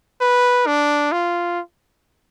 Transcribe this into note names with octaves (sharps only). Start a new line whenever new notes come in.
B4
D4
F4